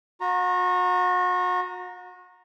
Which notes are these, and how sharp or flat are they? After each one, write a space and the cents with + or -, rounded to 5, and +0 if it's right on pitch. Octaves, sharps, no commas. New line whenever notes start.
F#4 -35 A#5 +0